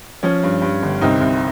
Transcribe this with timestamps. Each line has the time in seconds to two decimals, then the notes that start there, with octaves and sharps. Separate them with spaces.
0.23 F3 C#4
0.43 G2
0.62 G2
0.82 G1
1.01 C2 C4 D#4
1.21 C2